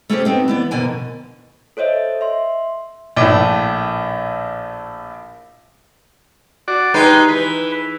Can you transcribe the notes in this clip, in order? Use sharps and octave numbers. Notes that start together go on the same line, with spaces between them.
A3 C#4 E4 G4 A4 C5
B3 C4 D#4
E3 B3 D5
F2 B2 D3 A#3 G#5
A4 C5 C#5 D#5 E5
E5 C6
A#1 A2
F#4 D5
G#3 D#4 G4 B4 C6
E3 B4